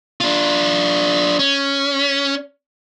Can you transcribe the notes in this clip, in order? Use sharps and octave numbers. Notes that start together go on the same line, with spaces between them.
D4 F4
C#4